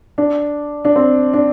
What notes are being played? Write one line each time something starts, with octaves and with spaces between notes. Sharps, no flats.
D4
D4
C4
D4